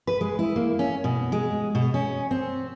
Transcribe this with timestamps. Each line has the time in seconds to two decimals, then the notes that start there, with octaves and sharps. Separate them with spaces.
0.07 B4
0.21 G#3
0.39 E4
0.56 A#3
0.79 C#4
1.04 B2
1.32 G#3
1.75 B2
1.94 C#4
2.31 C4